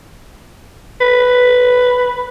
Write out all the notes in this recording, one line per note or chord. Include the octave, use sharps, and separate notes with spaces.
B4